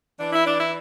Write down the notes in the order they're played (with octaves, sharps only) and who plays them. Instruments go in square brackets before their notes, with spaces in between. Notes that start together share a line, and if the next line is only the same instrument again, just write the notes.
[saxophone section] E3 D4
E4
D4
E4